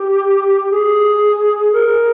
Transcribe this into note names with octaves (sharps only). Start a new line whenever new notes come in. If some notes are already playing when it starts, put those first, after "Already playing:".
Already playing: G4
G#4
A#4